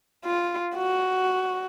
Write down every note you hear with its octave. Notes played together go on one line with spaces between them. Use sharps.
F4
F#4